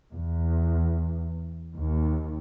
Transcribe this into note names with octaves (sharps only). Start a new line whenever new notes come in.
E2
D#2